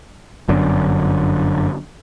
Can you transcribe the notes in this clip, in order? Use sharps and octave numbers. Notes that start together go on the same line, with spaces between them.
G1 F#2 D3